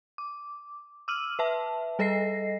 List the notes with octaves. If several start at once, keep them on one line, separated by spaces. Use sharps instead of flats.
D6
D6 E6 F6 D#7 F#7
B4 E5 A5
G3 A4 D#5 A#6 C7